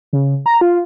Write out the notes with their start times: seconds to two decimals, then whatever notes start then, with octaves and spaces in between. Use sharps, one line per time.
0.13 C#3
0.46 A#5
0.61 F4